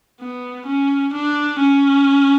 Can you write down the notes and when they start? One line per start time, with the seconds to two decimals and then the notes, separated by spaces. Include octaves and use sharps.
0.20 B3
0.66 C#4
1.13 D4
1.59 C#4